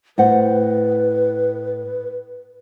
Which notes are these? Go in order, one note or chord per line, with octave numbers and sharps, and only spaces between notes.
A2 B4 C5 F#5